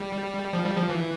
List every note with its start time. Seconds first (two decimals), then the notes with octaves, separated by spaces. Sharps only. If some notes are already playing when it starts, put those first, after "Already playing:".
Already playing: G3
0.53 F3
0.66 G3
0.77 F3
0.89 E3